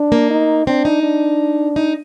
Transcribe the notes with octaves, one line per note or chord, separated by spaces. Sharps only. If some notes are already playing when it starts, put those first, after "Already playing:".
Already playing: D4
A#3
D#4
C4 D4
D#4
D4
D#4